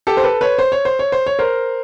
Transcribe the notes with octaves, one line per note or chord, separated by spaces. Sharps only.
G4 A4
C5
A4 B4
B4 C#5
C5
C#5
C5
C#5
C5
C#5
A#4 C5